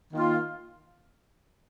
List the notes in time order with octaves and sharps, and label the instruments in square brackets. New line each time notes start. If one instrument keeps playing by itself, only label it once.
[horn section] D#3 A#3 F4